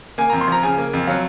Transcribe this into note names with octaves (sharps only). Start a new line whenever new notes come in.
A#3 G#5
F2 A#5
C6
F3 A#5
C#3 G#5
A#3
F2
F#3 F5